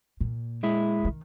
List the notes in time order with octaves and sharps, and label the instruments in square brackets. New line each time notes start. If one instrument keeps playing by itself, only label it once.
[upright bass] A#2
[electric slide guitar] G#3 E4
[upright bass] D#3